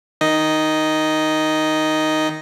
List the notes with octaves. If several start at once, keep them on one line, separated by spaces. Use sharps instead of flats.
D#3 D#4 D#5